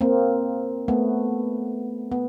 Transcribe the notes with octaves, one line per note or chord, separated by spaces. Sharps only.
A#3 C4
A3 B3
B3